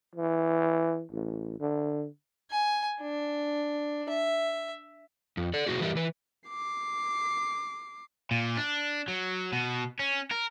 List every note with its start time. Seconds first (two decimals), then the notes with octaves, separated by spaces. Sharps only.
0.15 E3
1.12 A1
1.60 D3
2.51 G#5
3.01 D4
4.09 E5
5.37 F2
5.54 A4 D5
5.67 B2 D#3 A#3 F#4 G#4
5.81 E3 G3 E4 G4 A#4
5.95 E3 B4
6.49 D6 C7
8.31 A#2
8.58 D4
9.08 F#3
9.53 B2
9.99 C#4
10.31 A#4